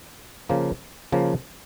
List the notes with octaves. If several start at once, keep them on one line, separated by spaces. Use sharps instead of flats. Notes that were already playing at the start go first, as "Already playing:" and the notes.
C#3 F3 A#3
C#3 F3 A#3